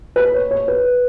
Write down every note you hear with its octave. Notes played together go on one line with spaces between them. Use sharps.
B4
C#5
C#5
B4